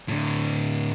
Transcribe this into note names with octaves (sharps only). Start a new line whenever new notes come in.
A2 D3